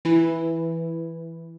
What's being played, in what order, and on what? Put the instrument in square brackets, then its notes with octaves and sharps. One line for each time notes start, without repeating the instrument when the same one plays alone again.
[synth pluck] E3 E4